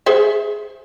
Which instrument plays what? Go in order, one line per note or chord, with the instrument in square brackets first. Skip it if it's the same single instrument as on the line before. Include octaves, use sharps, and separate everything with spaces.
[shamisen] G#4 C5 E5